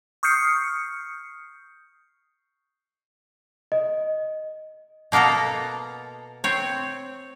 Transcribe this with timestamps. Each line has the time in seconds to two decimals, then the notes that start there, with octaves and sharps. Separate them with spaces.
0.23 C#6 D#6 F6 G6 C7 C#7
3.72 D#5
5.12 B2 A#3 B3 A4 A#5
6.44 C4 C#5